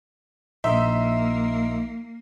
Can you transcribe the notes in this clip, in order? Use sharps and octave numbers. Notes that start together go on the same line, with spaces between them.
A#1 A#3 D#4 E5 C6